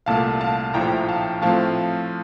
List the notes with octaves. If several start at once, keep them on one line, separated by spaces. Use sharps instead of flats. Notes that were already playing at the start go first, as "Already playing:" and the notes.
C2 A#2 A3 F5 A5
F5 A5
A#1 A2 F3 G5 A#5
F5 A5
A2 F3 A3 C4 F5 A5